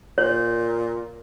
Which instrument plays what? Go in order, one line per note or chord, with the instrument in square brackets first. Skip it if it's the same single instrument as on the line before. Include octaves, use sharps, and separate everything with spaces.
[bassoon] A#2 [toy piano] C#5